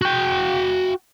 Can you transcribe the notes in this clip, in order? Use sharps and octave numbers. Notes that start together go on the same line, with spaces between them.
F#4 G5